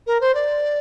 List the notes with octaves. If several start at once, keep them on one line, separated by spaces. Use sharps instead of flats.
A#4
C5
D5